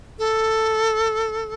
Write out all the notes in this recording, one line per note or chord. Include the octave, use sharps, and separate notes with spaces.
A4